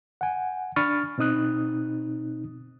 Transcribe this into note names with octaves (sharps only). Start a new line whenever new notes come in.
F#5 G#5
D4 B5 C#6 F6 A6
B2 C4 D#4 D#6 F#6